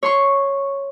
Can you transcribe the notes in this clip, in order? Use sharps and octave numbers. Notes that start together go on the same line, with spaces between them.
C#5 C6 C#6